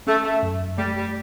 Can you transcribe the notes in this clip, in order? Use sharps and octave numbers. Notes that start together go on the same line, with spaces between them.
A3 C#4
A3
F#2
G3 A3
G3